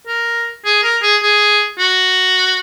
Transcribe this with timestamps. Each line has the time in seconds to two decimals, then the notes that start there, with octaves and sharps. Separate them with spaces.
0.08 A#4
0.65 G#4
0.83 A#4
1.03 G#4
1.23 G#4
1.79 F#4